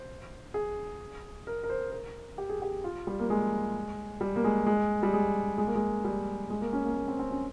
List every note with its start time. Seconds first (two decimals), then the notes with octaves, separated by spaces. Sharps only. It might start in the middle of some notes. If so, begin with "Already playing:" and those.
Already playing: C5
0.54 G#4
1.47 A#4
1.64 A#4
1.70 C5
1.92 A#4
2.38 G4
2.49 G#4
2.62 G4
2.84 F4
3.07 G3
3.20 A#3
3.30 G#3
4.21 G3
4.36 A#3
4.44 G#3
4.66 G#3
5.03 G3
5.13 G#3
5.58 G#3
5.67 A#3
5.75 G#3
6.04 G3
6.50 G#3
6.61 A#3
6.73 C#4
6.85 A#3
6.96 A#3
7.08 C4
7.19 C4
7.31 C#4